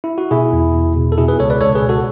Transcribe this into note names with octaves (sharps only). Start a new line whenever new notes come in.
E4
F#4
B2 E4 G#4
E2
E2
B2
A4
B2 E4 G#4
G#4 B4
C#2 A4 C#5
B4 D5
C#2 A4 C#5
G#4 B4
B2
F#4 A4